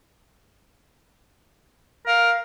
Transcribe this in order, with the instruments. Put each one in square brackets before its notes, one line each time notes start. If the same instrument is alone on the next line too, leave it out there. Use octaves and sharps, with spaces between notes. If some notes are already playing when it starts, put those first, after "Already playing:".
[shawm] A#4 [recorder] F5